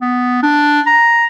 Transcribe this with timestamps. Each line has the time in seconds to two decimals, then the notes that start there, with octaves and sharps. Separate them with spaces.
0.02 B3
0.43 D4
0.87 A#5